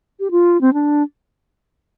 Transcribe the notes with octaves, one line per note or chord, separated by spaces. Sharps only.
G4
F4
C4
D4